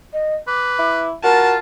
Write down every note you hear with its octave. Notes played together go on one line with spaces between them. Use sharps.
D#5
B4 D6
E4
F4 F#4 A#4 A5